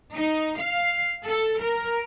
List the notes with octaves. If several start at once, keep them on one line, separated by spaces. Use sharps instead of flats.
D#4
F5
A4
A#4